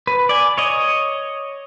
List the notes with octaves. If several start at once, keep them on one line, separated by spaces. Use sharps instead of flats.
B4
D5 G#5
C#5 D#5